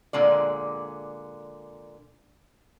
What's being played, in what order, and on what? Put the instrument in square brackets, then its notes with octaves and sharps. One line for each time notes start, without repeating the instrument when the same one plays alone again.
[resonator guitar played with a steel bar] A#2 D3 G#3 D5